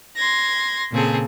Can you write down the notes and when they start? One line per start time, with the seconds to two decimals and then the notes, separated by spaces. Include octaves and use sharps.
0.17 C6 G#6 A#6
0.92 A#2 C#3 C4 G#4 A4